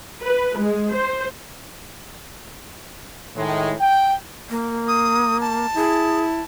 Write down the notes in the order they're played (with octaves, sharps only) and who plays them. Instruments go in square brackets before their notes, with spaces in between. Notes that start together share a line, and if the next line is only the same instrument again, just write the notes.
[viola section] B4
G#3
C5
[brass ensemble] A2 D#3 G#3
G5
[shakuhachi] A#3
[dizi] D#6
A5
[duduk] E4 [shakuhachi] G#4